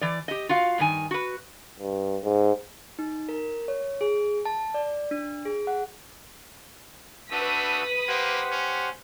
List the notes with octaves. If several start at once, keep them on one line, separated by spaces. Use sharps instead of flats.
E3 D5
G4 D#5
F4 F#4 F5
G2 D#3 G#5
F#4 B4
G2
G#2
D#4
A#4
C#5
G#4
A5
D5
D4
G#4
F#5
A3 D4 F#4 B4 D#6 E6 B6
A#3 G4 C5 F#5
C#4